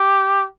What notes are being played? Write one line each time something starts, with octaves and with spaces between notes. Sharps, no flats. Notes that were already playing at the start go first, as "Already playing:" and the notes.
Already playing: G4